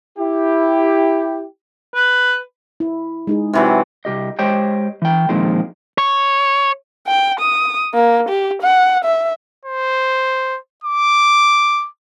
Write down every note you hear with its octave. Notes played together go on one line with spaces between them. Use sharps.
E4 G4
B4
E4
G#3 D#4 G#4
C3 E3 F#3
C2 G4 D#5
G#3 G4 C5 C#5 D#5 G5
E3 G5
D#2 A#2 D#3 F3 G#3 C4
C#5
G5
D#6
A#3
G4
F#5
E5
C5
D6